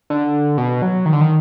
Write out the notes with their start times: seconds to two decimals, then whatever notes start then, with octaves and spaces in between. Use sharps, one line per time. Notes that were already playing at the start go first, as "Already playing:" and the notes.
0.10 D3
0.58 B2
0.82 F#3
1.06 D#3
1.13 D3
1.21 D#3